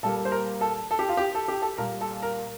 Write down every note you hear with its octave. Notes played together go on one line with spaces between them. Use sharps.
A#2 G3 A#3 A4
C5
A#4
A4
A4
G4
F4
G4
A4
G4
A4
A#2 G3 A#3 A#4
A4
A#4